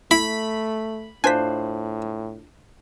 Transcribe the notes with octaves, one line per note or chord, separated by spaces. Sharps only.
A3 E4 B5
A2 D4 F4 C5 G#5 B6